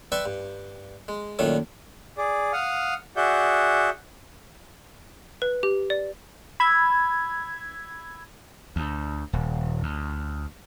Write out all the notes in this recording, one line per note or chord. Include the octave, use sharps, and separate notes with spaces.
B4 D5 E5 G5 C6 C#6
G2
G#3
F#2 A#2 D#3 A3 D4 C#5
G#4 D5
F5 F#5 D#6 F6
F#4 G#4 D5 E5 F#5 G6
B4
G4
D5
B5 E6 G#6
D2
D#1
D2